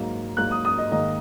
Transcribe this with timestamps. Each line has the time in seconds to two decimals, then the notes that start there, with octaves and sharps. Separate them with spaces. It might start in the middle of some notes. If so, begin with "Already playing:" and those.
Already playing: G#2 F#3 A#3
0.37 G#2 F#3 A#3 F#6
0.51 D#6
0.65 D#6
0.78 D#5
0.91 G#2 D#3 A#3 D#5